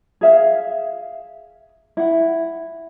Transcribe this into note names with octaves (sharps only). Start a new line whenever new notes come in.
G#4 E5 F5
E4 F#5